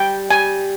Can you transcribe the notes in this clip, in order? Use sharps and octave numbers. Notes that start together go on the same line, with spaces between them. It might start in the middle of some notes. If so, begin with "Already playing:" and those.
Already playing: G3 G5
G3 G#5